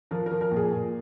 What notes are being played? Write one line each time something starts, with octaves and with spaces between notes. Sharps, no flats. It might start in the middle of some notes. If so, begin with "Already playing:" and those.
F3 A#4
A#4
F3
A#4
A#2 G#4
A#2